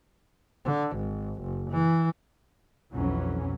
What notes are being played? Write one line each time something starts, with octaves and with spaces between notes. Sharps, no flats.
D3
G#1
F#1
E3
B1 F2 E3 F#3 C#4